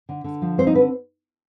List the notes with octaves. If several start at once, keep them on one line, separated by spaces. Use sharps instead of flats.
D3
D3
F3
C4 C5
D#4
D3 B4